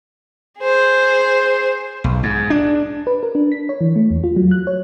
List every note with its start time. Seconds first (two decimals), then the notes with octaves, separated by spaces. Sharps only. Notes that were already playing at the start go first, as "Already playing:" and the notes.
0.59 G#4 C5
2.04 B1
2.23 G#2
2.50 D4
3.07 B4
3.23 A#4
3.35 D4
3.52 B6
3.69 C#5
3.81 E3
3.96 A3
4.11 E2
4.24 F4
4.36 F#3
4.51 F#6
4.67 C#5